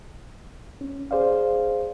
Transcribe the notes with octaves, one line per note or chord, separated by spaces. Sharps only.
C#4
G#4 C5 D5 F5